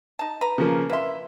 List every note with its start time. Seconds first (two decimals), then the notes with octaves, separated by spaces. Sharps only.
0.19 D#4 A5
0.41 B4 A#5
0.58 C#3 F3 A#3
0.90 A#3 B4 E5 C6